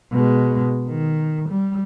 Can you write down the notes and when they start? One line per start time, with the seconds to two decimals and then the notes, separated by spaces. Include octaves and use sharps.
0.12 B2 G#3
0.88 D#3
1.49 G3